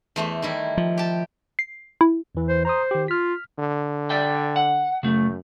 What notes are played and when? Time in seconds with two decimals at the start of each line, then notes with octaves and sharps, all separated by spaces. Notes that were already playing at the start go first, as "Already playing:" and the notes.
0.16 E2 A3 C5
0.42 D#3 G3 E4
0.77 F3
0.98 G4 A5
1.59 C7
2.01 E4
2.35 E2 E3
2.49 C5
2.65 C5 A#5 C6 D#6
2.91 D#3 G4
3.08 F4 F6 B6
3.59 D3
4.10 D5 E5 G5
4.56 F#5
5.03 F#2 C#3 A3